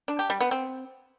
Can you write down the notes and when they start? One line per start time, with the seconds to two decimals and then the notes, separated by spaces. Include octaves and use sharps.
0.08 D4
0.19 G4
0.30 G3
0.41 B3
0.51 C4